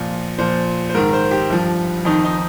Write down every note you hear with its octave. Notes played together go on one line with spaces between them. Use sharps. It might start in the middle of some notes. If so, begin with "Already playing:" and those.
Already playing: A#2 F3
A#2 F3 C5
C5
G#2 D#3 A#4
C5
G4
G2 F3
F2 D#3 D#4
D#4